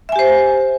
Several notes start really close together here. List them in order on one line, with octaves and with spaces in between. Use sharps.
E5 G#5 G4 C5